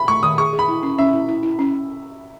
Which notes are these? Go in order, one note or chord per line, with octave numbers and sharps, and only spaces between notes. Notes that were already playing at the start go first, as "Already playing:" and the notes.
Already playing: B5
A3 C#6
D#3 D#6
G#4 C#6
G#4
B5
E4
C#4
C#4 E5
E4
E4
E4
C#4